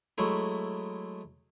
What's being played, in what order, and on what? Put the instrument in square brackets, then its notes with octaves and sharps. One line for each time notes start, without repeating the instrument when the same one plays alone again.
[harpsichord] F#3 G#3 A3 E4